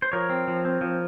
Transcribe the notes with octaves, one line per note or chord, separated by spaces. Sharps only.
C5
F3 A#4 C#5
C4
F3
C4
F3